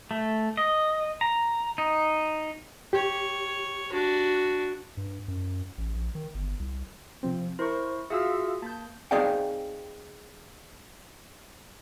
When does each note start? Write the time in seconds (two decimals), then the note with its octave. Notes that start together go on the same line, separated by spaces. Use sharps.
0.11 A3
0.57 D#5
1.21 A#5
1.78 D#4
2.93 G4 C#5
3.92 D4 F#4
4.97 G2
5.28 F#2
5.78 A1
5.94 A#1
6.15 D#3
6.35 G1
6.60 C2
7.23 C3 F3 C4
7.59 E4 A#4 C5 C#6
8.10 F4 F#4 G#4 E5 F5 E6
8.62 A#3 A5 G6
9.11 C4 D#4 G#4 D5 F5 G5